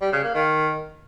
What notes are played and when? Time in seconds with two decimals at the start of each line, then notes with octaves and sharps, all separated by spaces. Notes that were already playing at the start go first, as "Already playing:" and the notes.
0.01 G3
0.12 C#3
0.23 A#3
0.35 D#3